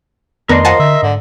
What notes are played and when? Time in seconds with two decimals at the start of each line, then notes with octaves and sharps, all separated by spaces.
0.49 F2 D#3 A3 B3 D4 A#4 D#5 C6
0.65 F3 F#5 G#5 A5
0.79 D3 E5
1.03 G#2 D3